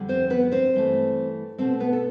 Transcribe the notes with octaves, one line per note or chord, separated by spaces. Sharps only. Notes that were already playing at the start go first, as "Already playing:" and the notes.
Already playing: F2 D3 G3
C4 C5
B3 B4
C4 C5
G2 E3 A3
B2 A3 C4 C5
B3 B4
A4